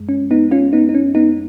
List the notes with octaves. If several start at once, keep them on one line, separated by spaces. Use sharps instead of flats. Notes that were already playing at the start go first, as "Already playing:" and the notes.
Already playing: F#2 G#3
C#4
B3 D#4
C#4 F4
B3 D#4
D#4
C#4
B3 D#4